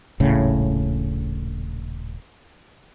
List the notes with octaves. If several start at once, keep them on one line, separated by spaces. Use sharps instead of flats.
D#1 A#1 A2 C#3